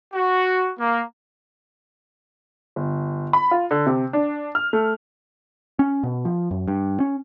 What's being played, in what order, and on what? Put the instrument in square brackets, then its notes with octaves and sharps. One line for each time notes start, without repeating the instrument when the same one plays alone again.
[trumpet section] F#4
A#3
[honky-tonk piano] G1
B5
F4
D3
C3
D4
F6
A3
[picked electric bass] C#4
B2
F3
F#2
G2
C#4